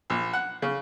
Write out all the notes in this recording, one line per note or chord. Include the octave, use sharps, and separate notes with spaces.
A#1
F#5
C#3